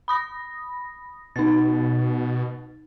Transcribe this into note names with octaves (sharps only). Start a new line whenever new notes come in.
B5 D#6 A#6
B2 D#4 A6